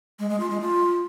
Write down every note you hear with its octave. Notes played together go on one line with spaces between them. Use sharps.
G#3
G#3
F4
G#3
F4